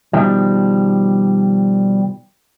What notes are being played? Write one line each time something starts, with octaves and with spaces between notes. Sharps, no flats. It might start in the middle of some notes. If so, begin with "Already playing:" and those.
B2 D#3 F3 G3